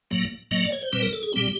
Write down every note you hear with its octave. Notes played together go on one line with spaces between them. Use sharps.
A2 F#3 A#3
A2 F#3 A#3 D#5
D5
C#5
C5
A#2 G3 C4 B4
A#4
A4
G#4
A#2 G3 C4 G4